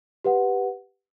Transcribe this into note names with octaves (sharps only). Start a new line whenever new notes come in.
G4 B4 F#5